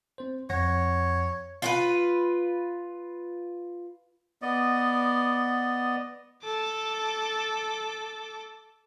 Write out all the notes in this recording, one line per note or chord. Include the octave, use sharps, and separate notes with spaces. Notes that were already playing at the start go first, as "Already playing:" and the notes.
C4 C5
F2 C#5 F#5 A#6
F4 F#4 B4
B3 D5 D#5
A4 D6